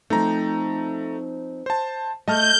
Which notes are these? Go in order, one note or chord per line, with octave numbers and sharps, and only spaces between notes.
F3 A3 C4 D#4 A#5
C5 A5
A3 D#5 A5 F6 G6